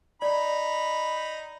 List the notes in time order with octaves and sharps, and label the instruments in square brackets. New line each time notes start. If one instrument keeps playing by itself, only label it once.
[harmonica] D#4 B5 [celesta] D5